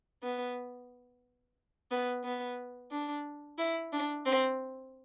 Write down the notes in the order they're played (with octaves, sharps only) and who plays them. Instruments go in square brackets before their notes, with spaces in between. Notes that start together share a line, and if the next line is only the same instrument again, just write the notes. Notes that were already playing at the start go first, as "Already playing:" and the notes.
[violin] B3
B3
B3
D4
E4
D4
C4